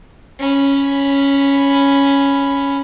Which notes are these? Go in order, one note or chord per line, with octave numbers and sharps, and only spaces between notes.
C#4 B5